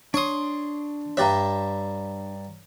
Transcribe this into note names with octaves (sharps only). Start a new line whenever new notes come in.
D4 C#5 C6 C#6 D#6
G2 G3 C#5 E5 A#5